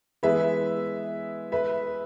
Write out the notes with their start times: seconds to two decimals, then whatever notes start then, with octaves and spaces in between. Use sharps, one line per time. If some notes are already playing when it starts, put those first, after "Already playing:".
0.23 E3 G#3 B3 G#4 B4 E5
1.52 B4 E5